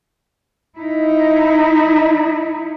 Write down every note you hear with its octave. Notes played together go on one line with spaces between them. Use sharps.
D#4 E4